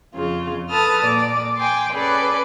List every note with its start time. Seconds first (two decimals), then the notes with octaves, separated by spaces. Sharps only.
0.14 F2 C#3 F4
0.71 A4 B4 A5 D#6 F6
1.04 A#2 D5
1.57 G5 G#5 C6 D6
1.92 C#4 G#4 A4 B4 D5